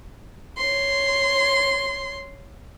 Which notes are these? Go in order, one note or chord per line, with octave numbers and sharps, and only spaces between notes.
C#5 C6